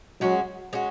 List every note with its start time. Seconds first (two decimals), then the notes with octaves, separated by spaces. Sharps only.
0.21 F#3 G#3 C#4 F#4
0.73 G#3 C#4 F#4